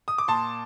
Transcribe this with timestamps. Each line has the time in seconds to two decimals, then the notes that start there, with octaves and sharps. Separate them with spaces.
0.08 D#6
0.18 D6
0.28 A#2 A5 C6